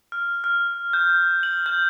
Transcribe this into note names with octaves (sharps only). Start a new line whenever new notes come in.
F6
F6
G6
F#7
G6